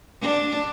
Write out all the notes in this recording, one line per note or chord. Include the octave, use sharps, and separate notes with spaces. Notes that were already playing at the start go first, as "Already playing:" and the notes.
D4